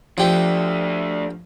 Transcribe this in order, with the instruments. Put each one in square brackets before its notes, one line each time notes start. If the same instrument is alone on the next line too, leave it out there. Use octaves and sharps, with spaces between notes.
[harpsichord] F3 G4 [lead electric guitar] A3 D4